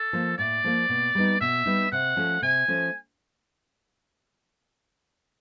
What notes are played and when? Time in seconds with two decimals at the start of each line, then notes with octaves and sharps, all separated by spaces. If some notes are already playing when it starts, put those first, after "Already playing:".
Already playing: A4
0.13 F3 A#3
0.38 A2 D5
0.64 F3 A#3
0.89 B2
1.15 G3 B3 D#4
1.41 B2 E5
1.66 G3 B3 D#4
1.92 C3 F#5
2.17 F3 A3 C#4
2.42 C3 G#5
2.68 F3 A3 C#4